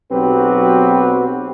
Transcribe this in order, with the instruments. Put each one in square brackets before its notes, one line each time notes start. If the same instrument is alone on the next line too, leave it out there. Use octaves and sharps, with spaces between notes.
[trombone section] B1 F#3 C4 F#4 G4 B4